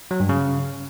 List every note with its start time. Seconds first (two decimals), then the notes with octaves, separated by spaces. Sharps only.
0.11 F#3
0.20 G2
0.29 C#3